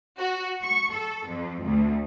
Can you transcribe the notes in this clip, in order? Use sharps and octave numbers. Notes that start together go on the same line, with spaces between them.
F#4
C#6
A4
F2
D2